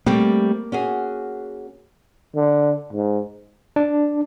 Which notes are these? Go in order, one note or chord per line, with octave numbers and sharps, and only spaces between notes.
G3 A3 A#3 C4
C#4 F#4 G#4
D3
G#2
D4